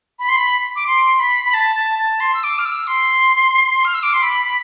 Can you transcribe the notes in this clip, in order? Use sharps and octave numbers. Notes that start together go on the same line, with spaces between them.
B5
C6
B5
D6
C6
B5
B5
A5
A5
A5
C6
E6
D6
F6
E6
C6
F6
E6
D6
C6
B5
B5